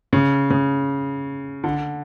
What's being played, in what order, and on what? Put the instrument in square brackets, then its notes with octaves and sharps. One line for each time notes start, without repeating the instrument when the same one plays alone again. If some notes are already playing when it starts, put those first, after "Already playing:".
[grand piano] C#3
C#3
D3